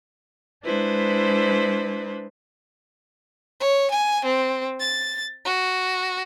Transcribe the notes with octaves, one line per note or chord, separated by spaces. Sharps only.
G#3 D4 E4 B4 C5
C#5
G#5
C4
A6
F#4